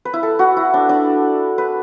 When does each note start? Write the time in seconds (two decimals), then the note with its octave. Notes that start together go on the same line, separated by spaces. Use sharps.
0.05 B4
0.13 E4
0.23 A4
0.39 F#4
0.57 E4
0.74 D4
0.89 D4
1.58 B4